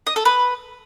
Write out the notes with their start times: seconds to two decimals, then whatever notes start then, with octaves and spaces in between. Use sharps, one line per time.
0.07 D#5
0.16 A4
0.25 B4